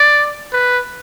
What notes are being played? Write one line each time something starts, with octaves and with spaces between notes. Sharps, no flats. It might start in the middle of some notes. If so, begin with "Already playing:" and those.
Already playing: D5
B4